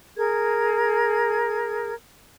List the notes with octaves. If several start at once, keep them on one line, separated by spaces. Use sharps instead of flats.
G#4 A#4 G#6